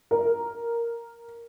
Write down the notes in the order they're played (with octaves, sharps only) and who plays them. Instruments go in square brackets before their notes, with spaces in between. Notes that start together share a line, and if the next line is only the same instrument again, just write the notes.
[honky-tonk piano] A#4